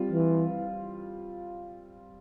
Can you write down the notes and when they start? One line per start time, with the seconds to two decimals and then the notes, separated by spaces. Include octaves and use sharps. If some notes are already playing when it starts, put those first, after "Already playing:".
Already playing: G3 C4 F4
0.11 E3